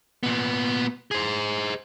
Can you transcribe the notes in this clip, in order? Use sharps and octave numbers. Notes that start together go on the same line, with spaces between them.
A#2 B3
G#4 C5